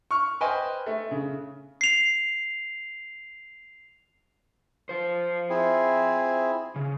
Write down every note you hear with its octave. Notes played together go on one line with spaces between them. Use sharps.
C#6 F6
B4 C5 D#5 G5 G#5
A3
C#3
C7 F7
F4 C5
C4 E4 G#4
C#3